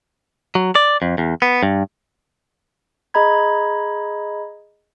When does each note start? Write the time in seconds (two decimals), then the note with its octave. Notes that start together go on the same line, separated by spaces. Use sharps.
0.55 F#3
0.75 D5
1.02 F2
1.18 E2
1.42 B3
1.63 G2
3.14 G#4 D#5 A#5 B5 G#6